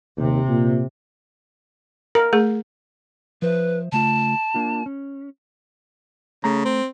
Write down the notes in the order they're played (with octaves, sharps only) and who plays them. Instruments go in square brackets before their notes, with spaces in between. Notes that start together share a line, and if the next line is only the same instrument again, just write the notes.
[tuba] D#2 [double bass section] C3
[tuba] A#2
[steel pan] A#4
[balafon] A3 G#4
[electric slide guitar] F3 C5 E5 [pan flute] B4
[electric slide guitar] C#3 A3 F4 [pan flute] A5
[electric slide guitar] A#3 D4 F4
C#4
[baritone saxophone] C#3 [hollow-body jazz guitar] A3 A#5
[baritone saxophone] C4